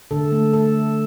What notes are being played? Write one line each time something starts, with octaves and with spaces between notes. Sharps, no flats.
D3 A4
A3
A3 A4